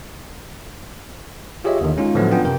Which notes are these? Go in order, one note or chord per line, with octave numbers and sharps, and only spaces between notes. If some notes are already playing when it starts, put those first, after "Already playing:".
F4 G4 G#4 C#5 D#5 E5
D#2 D3 D#3
G#3 C#4 D#4 F4
A2 D3 F3 F#3 A3 B3
B3 C#4 D4 F4 G5
F#2 C3 A#4 G5